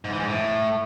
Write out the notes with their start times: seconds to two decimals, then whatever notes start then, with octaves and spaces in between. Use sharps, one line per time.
0.04 G#2
0.12 E3
0.20 G#2
0.28 A2